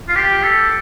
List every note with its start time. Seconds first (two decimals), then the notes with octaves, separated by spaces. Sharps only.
0.08 F4
0.15 G4
0.43 A4